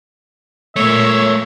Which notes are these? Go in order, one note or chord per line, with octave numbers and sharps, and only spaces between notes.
A#2 A3 A#3 C#5 E5